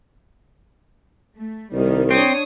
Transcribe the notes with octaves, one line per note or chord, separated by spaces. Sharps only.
A3
C2 D#3 G3
C4 D4 C#5 D#6